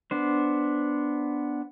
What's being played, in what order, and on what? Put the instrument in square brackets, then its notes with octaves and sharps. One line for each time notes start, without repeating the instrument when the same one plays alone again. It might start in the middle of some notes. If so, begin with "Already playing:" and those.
[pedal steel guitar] B3 D4 C5